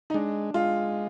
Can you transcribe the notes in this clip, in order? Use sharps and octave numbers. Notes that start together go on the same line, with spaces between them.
D#4
G#3 D4
G#3 F4